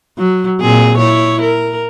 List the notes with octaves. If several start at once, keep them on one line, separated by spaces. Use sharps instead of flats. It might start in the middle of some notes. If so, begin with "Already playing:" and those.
F#3
A#2 C4 G#4
E4 C#5
A#4